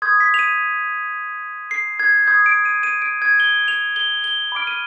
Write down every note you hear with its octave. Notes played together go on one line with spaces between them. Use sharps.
C6 D#6 G6 G#6
B6
F7
D#7
C7
G#6
C6 D#6 G6 G#6
D7
D#7
D#7
D7
G#6
G7
F7
G7
G7
B5 D6 F6 D7
D#7